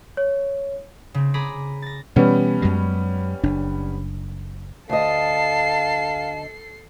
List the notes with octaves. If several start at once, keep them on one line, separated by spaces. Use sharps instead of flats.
C#5
C#3 C4
G#4 A#5 B5 D6
A6 A#6
B2 E3 G3 B3 C#4
F#2 F#3 G#3
F#1 D4
D2 A4 D#5 F5 A5 C7